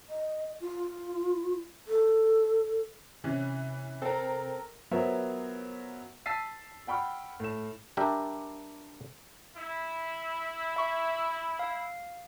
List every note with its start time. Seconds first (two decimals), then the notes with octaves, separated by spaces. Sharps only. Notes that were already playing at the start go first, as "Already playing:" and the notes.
0.09 D#5
0.61 F4
1.88 A4
3.24 C3 E3 C#4
4.02 C4 A4 A#4
4.91 F#3 B3 F4 A#4 C5 E5
6.26 A5 E6 A6 B6 C7 D#7
6.87 F#5 G5 B5 C#6 F6
7.40 A2 E7
7.97 G3 D4 G4 A#4 E5
9.58 E4
10.76 E5 C#6
11.59 F5